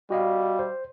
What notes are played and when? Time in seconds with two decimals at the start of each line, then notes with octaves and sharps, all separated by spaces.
0.10 G3 F#4 D#5 F5
0.59 C5